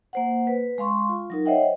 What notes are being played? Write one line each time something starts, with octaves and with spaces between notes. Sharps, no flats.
A#3 C5 F#5
B4
G#3 F5 C6 C#6
F4
F#3 D#4 A#4
C5 C#5 D#5 E5 F#5 G5